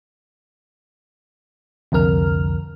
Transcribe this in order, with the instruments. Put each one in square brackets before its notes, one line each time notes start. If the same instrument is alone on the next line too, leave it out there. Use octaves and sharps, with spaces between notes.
[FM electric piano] C2 F2 D3 A#4 F6